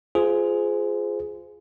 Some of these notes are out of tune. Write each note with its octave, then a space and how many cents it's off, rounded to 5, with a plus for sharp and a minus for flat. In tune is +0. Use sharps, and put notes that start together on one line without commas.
F4 -5 G#4 +10 C5 -25